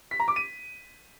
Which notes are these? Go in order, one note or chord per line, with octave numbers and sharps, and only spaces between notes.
B6
A#5
D6
D#7